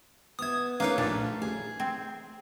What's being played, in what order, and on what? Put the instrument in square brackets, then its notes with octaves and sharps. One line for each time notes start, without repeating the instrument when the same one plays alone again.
[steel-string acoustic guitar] B3 E5 [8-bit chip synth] D#6 G#6
[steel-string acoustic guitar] A3 C#4 [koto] A#3 [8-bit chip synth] D#4 B4 F5
[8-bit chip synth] A#1 A#2 [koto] D4
[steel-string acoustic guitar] G#4
[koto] C4